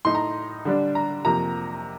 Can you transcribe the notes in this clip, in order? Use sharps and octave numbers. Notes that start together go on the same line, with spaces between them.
A2 A3 D#4 C6
A#5
D3 G3 D4
A#5
F2 C3 F3 A#3 A#5